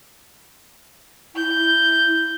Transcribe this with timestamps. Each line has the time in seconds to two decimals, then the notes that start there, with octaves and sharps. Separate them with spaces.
1.35 E4 G6